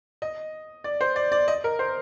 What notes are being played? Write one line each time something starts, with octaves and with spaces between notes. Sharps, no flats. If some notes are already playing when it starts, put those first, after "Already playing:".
D#5
D5
C5
D5
D5
D#5
A#4
C5